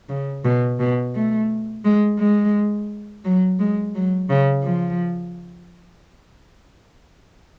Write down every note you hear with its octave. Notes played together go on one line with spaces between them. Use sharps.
C#3
B2
B2
A3
G#3
G#3
F#3
G#3
F#3
C#3
F3